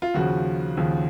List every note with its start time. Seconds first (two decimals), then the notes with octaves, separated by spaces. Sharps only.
0.02 F4
0.14 D#2 C#3 F3 F#4
0.77 D#2 C#3 F3